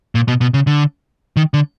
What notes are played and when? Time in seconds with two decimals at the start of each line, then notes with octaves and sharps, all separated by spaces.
0.15 A#2
0.28 B2
0.41 B2
0.54 C#3
0.67 D3
1.37 D#3
1.54 D3